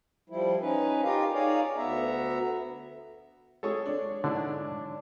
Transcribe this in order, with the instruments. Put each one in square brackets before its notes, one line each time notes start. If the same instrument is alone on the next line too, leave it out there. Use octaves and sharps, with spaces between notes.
[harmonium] F3 G3 E4
C#4 D#4 B4
D#4 F4 G4 A#4 F5
D#4 G#4 C#5 D5 F5
D2 B3 E5 A#5
[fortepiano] G#3 F4 G#4 [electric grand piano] A4 C#5 C#6
[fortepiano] D4 [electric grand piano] C#5
[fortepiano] G#2 E4 D5 [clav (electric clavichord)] D3 [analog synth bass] D4